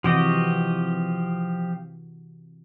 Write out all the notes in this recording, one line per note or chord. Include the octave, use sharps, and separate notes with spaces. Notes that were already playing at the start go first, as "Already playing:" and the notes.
C3 E3 F3 F#4 G4 D#5